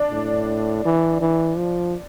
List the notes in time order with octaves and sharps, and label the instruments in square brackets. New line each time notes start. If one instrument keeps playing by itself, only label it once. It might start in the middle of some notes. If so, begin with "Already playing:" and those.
Already playing: [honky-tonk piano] D4
[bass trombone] A2
E3
E3
F3